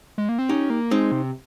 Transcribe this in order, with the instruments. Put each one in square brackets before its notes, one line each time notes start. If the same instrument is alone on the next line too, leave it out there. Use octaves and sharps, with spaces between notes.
[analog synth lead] G#3
A#3
C4
[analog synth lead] C#4 [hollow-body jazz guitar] D#4 G4
[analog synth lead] A#3
[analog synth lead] G#3 [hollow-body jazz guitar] C4 D#4
[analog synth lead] C3